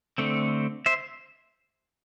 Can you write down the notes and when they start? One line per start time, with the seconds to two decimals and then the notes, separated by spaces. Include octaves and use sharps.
0.18 D3 A3 C4
0.86 C5 E5